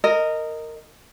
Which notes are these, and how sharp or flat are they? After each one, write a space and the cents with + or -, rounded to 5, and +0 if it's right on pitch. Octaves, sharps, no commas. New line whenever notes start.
A#4 -15 D#5 +0